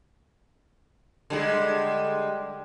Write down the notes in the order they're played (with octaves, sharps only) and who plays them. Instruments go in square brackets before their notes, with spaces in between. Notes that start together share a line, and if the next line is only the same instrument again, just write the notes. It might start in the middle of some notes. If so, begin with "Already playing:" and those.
[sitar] D3 G3 G#3